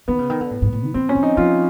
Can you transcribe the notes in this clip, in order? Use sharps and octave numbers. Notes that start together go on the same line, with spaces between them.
D#3 B3
C#3
D#3
D3
A2
G#2
A2
D#3
E3 C4
C#4
F3
D#4
F3 F4